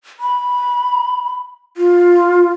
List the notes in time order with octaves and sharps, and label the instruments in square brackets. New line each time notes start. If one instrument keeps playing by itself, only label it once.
[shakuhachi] B5
F4